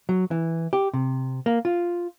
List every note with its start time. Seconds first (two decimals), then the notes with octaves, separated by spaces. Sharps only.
0.09 F#3
0.31 E3
0.73 G4
0.94 C3
1.46 A#3
1.65 F4